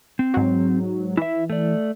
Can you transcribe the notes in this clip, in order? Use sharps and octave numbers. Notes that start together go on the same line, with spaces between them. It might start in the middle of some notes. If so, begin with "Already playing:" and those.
C4
G#2 F#3
E3 E4 E5
A3 D5